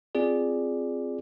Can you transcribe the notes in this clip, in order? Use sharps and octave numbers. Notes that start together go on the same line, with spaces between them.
C4 F4 G#4 D5